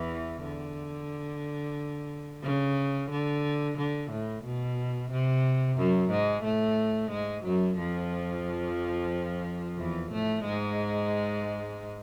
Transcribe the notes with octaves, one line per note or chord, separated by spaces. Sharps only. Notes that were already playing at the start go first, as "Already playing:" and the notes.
Already playing: E2 E3
D3
C#3
D3
D3
A2
B2
C3
F#2 F#3
G#2 G#3
A2 A3
G#2 G#3
F#2 F#3
F2 F3
E2 E3
A2 A3
G#2 G#3